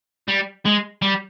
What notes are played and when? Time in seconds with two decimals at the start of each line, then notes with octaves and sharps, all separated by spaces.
0.28 G3
0.65 G#3
1.02 G3